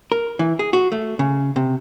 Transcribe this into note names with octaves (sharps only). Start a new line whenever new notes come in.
A#4
E3
G#4
F#4
A3
C#3
C3